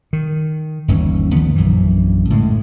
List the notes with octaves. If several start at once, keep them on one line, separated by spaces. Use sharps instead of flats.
D#3
G1 D#2 E3 C#4
D2 D#3 F3 B3
A#1 F#2 E3
A2 D3 G#3